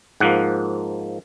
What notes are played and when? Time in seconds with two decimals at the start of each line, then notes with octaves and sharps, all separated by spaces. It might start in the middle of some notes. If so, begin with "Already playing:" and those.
0.20 G#2 F3 A#3 F#5